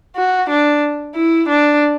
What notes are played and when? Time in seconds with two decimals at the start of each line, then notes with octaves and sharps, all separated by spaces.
0.16 F#4
0.50 D4
1.15 E4
1.49 D4